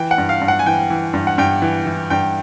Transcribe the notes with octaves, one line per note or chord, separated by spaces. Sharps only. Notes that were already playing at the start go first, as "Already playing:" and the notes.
Already playing: E3 G5
F#5
G2
F5
G2
F#5
G#5
E3 G5
E3
G2
F#5
G2 G5
E3
E3
G2 G5